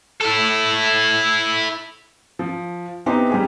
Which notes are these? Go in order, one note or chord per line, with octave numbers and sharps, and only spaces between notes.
E4 A4
F3
B3 C4 D#4 E4 G4 C5
G3 G4 G#4